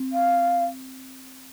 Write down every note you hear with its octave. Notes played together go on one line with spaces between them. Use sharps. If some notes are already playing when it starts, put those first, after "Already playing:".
Already playing: C4
F5